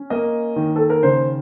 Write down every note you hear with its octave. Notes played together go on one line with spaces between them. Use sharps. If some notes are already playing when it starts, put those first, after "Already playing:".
Already playing: C#4
A#3 D#5
D#3
A4
A#4
C#3 C5